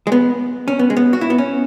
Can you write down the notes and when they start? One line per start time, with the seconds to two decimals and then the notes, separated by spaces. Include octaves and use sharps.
0.07 G#3
0.12 B3
0.68 C#4
0.79 B3
0.90 G#3
0.97 B3
1.13 F#4
1.21 E4
1.30 B3
1.38 C#4